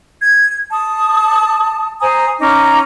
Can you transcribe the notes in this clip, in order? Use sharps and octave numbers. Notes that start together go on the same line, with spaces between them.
G#6
A5 D#6
C5 G#5 A#5 D#6
C#4 D#4 A#5 D6